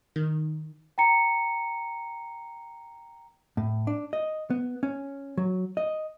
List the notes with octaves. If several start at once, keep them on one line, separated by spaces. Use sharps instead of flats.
D#3
G5 A#5 C#7
A2
D4
D#5
B3
C#4
F#3
D#5